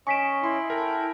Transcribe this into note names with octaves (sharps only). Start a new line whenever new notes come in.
C#4 D#5 G#5 C#6 B6 D7 E7
E4 C6
A4 A#4 G5